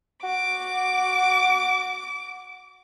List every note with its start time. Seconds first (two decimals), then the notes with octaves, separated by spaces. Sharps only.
0.23 F#4 D6